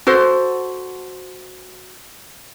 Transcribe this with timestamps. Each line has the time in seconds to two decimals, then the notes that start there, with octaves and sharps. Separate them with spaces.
0.07 F#4 A4 C5